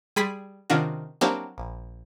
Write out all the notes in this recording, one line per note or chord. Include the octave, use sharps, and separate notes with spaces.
G3 G#4 B5 C6 A6 B6
C3 D#3 C#4 D4 F4 F#4
F#3 A#3 C4 D4 E4 G4
A#1